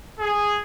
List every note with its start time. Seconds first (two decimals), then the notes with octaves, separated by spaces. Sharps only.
0.19 G#4